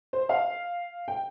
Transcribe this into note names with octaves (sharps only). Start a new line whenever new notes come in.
C5
F5
G5